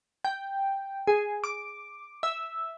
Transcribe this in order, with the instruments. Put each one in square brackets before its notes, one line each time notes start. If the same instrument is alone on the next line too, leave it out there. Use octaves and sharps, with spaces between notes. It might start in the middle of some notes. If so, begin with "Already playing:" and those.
[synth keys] G5
G#4
D6
E5